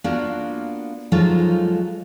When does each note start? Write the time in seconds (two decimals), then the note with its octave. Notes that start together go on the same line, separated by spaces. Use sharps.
0.04 A#3 B3 D4 F4 F#4 A#4
1.12 F3 F#3 G#3 D#4 F4 A4